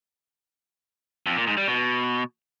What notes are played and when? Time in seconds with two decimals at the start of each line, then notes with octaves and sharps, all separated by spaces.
1.26 F2
1.37 A#2
1.47 G#2
1.57 G3
1.68 B2